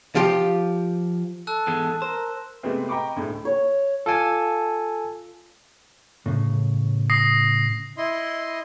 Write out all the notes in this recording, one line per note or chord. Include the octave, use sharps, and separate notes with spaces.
F3 F4 G4
A4 A5 E6 F#6
E2 G#2 G#3
A#4 C5
C3 G#3 A3 B3 C4
D#5 G5 A#5 B5 C#6 D6
D2 A2 G#3
C#5
F4 A4 D5 G#5 A5
A2 C#3
D#6 A#6 C7
E4 D#5 C6